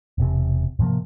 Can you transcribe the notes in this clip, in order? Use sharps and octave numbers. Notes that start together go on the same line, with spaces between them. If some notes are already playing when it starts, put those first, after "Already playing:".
E1 C3
G#2 C3 F3 A#3